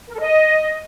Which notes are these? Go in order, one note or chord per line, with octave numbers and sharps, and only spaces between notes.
A#4
A4
D#5